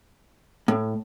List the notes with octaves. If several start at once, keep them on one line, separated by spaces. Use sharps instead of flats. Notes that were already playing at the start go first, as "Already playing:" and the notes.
A2